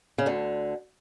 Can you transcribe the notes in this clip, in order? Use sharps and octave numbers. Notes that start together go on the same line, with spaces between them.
C#3
D2 D3